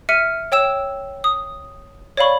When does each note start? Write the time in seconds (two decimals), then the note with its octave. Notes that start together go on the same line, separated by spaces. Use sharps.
0.09 E5 F6 C#7 D#7
0.52 C#5 G5 E6 E7
1.24 D#6
2.17 C#5 D5 F5 B5 C#6